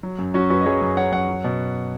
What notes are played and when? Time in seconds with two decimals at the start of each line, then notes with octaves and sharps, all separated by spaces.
0.03 F#3
0.19 F#2
0.34 F#3 C#4 F#4
0.50 F#2 F#4 B4
0.61 D#5
0.66 F#3 G#4 C#5
0.82 F#2
0.97 F#3 C#5 F#5
1.12 F#2 C#5 F#5
1.29 F#3
1.44 B2